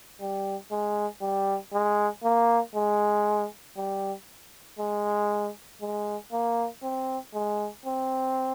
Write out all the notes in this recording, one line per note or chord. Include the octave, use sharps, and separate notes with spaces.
G3
G#3
G3
G#3
A#3
G#3
G3
G#3
G#3
A#3
C4
G#3
C4